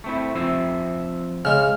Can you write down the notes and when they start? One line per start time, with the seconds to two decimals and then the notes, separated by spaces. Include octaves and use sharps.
0.04 A3 C4 E4
0.35 F3 C4 E5
1.45 C#3 G#3 F6